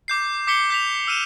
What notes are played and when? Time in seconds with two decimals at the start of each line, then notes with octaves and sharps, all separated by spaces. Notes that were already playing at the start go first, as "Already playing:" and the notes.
0.08 D6 G6 C7
0.47 D6 B6 C#7 G7
0.70 G6 B6 F7
1.07 E6 F6 D#7 E7